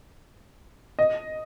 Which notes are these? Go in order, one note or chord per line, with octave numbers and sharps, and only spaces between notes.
D#5